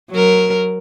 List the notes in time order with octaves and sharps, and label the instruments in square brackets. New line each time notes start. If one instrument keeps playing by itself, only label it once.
[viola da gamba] F#3 A#4